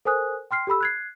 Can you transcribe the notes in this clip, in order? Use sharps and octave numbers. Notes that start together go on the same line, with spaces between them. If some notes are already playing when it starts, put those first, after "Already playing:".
A4 A#4 C5 G#5 D#6 F#6
G5 C6 F6 C7
G4 A4 B5 E6
F#6 G#6 C7